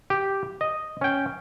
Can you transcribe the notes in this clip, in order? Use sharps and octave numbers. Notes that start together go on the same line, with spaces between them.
G4
D#5
C#4 G5